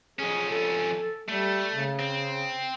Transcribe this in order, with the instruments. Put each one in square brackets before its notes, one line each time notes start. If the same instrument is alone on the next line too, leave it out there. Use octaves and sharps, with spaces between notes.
[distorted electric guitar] F2 C#4 [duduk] G#4
[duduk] A4
[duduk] G3 [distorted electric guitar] A3
[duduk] C#3
[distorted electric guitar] C4